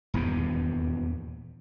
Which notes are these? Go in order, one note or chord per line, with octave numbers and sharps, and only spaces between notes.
D#1 E2 G2 B2